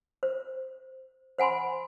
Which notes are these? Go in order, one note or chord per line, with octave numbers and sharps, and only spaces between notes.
C5
C5 F#5 G#5 B5 C6